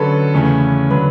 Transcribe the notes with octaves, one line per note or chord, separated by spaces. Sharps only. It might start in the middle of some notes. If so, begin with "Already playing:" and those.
Already playing: D3 F#3 C#4 A4 B4
E2 C#3 E3 A3 C#4
D3 F#3 B4